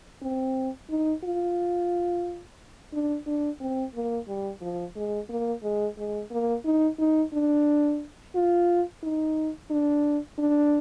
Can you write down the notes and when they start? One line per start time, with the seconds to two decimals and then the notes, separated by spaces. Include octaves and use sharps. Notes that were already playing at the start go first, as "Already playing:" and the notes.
0.22 C4
0.89 D#4
1.24 F4
2.93 D4
3.26 D4
3.60 C4
3.95 A#3
4.27 G3
4.61 F3
4.96 G#3
5.29 A#3
5.63 G#3
5.98 G#3
6.31 A#3
6.65 D#4
6.99 D#4
7.33 D4
8.35 F4
9.03 D#4
9.70 D4
10.38 D4